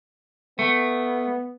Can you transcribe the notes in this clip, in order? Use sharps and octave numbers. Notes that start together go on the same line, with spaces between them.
A3 B3